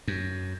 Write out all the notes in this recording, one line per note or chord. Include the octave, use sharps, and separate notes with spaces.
F#2